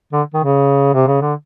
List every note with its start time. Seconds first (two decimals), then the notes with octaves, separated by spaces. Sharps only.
0.13 D3
0.34 D#3
0.44 C#3
0.94 C3
1.07 C#3
1.21 D3